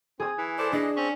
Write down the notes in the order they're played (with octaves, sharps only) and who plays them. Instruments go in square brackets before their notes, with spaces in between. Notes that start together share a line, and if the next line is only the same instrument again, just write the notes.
[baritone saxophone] C4 [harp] G#4 D#6
[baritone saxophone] E3
[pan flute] A4 [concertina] C5 D5 A5
[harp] D4 [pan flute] G#4 [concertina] D#5
[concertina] C4 C#6 [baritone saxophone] C#4